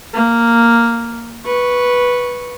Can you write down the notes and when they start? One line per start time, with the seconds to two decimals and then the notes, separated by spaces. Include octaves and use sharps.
0.14 A#3
1.45 B4 C#6